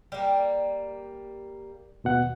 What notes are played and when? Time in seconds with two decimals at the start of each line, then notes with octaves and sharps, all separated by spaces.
0.12 G3 A#3
2.04 D#2 B2 F#5